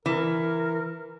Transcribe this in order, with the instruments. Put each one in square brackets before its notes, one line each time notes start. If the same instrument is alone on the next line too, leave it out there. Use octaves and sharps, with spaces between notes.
[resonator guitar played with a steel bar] E3 [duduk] A#4